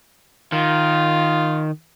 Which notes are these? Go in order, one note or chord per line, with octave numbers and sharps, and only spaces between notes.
D#3 F4